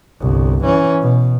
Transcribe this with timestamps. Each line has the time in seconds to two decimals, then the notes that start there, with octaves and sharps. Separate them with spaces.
0.20 G1 C2
0.64 E3 C#4
1.02 B2